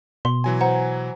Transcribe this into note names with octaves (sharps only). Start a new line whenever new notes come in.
B2 C6
E3 F#3 G#5
C5 F#5 A#5